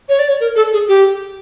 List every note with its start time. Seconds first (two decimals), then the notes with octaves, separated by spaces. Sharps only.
0.09 C#5
0.19 D5
0.28 C#5
0.41 A#4
0.56 A4
0.73 G#4
0.88 G4